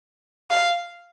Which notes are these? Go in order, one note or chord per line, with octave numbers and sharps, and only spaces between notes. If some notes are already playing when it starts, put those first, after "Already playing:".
F5